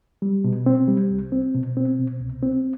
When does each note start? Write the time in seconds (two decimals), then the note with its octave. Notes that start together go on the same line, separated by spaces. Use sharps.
0.22 G3
0.44 B2
0.66 C4
0.88 G3
1.11 C2
1.32 C4
1.55 B2
1.77 C4
1.99 B2
2.21 C2
2.43 C4